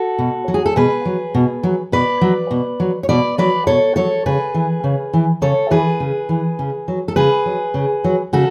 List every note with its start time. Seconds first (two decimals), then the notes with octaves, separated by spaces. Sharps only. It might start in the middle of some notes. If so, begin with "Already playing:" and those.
Already playing: F#4 A4
0.18 B2
0.48 F#3
0.54 G#4
0.66 A4
0.76 B2 G#4 B4
1.05 F#3
1.35 B2
1.63 F#3
1.92 B2 B4 D5
2.21 F#3
2.51 B2
2.80 F#3
3.03 C#5
3.09 B2 B4 D5
3.38 F#3 B4 D5
3.67 B2 A4 C#5
3.96 F#3 A4 C#5
4.26 C#3 G#4 B4
4.54 E3
4.84 C#3
5.13 E3
5.42 C#3 A4 C#5
5.71 E3 G#4 B4
6.00 C#3
6.29 E3
6.59 C#3
6.88 F#3
7.08 A4
7.16 C#3 G#4 B4
7.46 F#3
7.74 C#3
8.04 F#3
8.33 C#3 F#4 A4